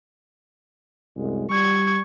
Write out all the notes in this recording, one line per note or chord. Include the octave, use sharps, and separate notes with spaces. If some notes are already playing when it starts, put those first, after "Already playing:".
C2 F#2 G#3
G3 C#6 G#6